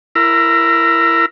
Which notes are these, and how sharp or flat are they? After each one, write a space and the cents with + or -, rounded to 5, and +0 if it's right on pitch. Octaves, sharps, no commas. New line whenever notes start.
E4 +25 A#4 +0